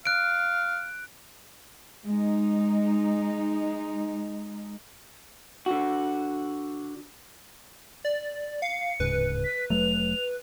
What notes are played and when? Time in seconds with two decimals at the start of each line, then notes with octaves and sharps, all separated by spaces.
0.05 F5 F#6 D7
2.05 G#3 D#4
5.66 D3 F#4
8.05 D5
8.62 F5 C#7
9.00 D1 G#2 C#3 B4
9.44 B6
9.70 F1 F#3 A3 F7